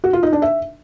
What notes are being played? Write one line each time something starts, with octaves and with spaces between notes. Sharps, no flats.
F#4
F4
D#4
D4
E5